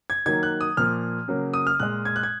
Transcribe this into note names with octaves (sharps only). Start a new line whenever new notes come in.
G#6
D#3 F#3 A#3 G#6
F#6
D#6
A#2 F3 A#3 F6
C#3 F#3 A#3
D#6
F6
A#2 G#3 F#6
G#6
F#6
G#6